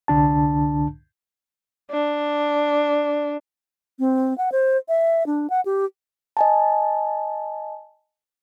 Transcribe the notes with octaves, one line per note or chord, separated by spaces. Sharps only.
C2 D3 D4 A5
D4
C4
F#5
C5
E5
D4
F#5
G4
D#5 G#5 A5